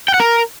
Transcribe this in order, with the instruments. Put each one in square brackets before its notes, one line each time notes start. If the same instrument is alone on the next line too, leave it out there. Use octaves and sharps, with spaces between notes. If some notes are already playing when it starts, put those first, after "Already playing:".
[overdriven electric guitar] G5
F#5
A#4